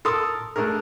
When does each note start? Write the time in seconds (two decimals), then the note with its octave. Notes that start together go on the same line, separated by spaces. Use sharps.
0.05 A4 A#4 C6 D#6
0.56 A3 D4 G#4 A#4